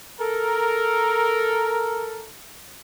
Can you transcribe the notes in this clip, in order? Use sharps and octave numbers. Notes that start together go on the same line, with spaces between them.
A4 A#4